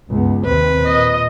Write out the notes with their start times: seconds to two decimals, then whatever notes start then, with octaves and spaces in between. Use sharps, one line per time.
0.11 C#2 G2 B3
0.45 D#2 C3 C4 B4
0.87 A#2 D#5